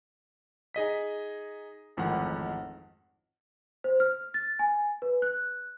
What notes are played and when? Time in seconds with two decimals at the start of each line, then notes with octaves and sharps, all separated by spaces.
0.74 D#4 G#4 D#5 B6
1.97 A1 F2 G#2 D#3 F#5
3.84 C5
4.00 F6
4.34 A6
4.59 G#5
5.02 B4
5.22 F#6